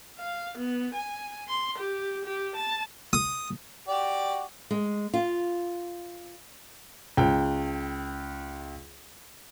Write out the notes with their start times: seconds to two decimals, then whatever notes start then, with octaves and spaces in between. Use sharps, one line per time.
0.19 F5
0.57 B3
0.94 G#5
1.48 C6
1.78 G4
2.25 G4
2.56 A5
3.13 D#6
3.88 F#4 G4 D5
4.71 G#3
5.14 F4
7.17 C#2 G5